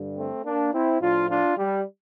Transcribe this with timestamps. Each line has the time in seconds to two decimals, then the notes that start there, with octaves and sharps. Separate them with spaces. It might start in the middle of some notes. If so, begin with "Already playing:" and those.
Already playing: G2 D3 G3
0.18 A3 C4
0.45 A#3 D4
0.74 C4 E4
1.01 A2 F3 D4 F4
1.30 D4 F4
1.58 G3